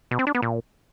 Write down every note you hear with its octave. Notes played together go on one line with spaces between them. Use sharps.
B2
C4
D4
B3
A#2